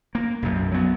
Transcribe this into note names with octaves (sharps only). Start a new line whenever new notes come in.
A#3
B1 F#2
F#3 B3